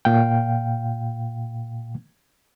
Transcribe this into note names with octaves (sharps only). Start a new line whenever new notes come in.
A#2 F5 G5